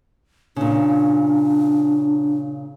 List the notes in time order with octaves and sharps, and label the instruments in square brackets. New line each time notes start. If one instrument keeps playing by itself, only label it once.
[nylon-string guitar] A#2 C#3 [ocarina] D4